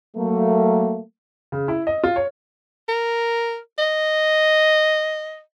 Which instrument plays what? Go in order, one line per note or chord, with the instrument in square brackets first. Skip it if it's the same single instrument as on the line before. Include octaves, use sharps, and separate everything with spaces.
[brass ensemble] F#3 A3 A#3
[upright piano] C#3
E4
D#5
F4
C#5
[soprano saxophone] A#4
D#5